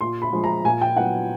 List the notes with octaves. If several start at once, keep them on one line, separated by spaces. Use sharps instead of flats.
A#2 C6
B5
F3 G#3
A#5
A#2 G#5
G5
F#3 B3 E4 F#5